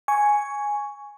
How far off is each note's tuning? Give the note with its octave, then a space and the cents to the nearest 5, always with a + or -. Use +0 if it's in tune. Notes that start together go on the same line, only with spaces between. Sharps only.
G#5 +0 C#6 +10